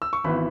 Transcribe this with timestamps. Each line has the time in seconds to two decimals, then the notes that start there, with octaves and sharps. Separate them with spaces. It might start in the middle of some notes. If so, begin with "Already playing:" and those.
0.02 E6
0.13 C#6
0.24 G#1 E3 B3 B5